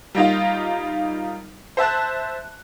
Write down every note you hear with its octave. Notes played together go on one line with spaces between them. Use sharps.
G3 A#3 D#4 F4
C5 E5 A5 F#6